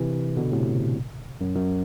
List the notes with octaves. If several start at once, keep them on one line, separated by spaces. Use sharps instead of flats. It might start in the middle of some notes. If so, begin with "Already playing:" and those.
Already playing: C3 E3
B2 D3
A2 C3
F#2
F#2